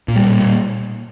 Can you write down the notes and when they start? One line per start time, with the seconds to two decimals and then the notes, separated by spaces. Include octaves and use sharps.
0.08 A#2
0.16 G3
0.24 A#2
0.40 A#2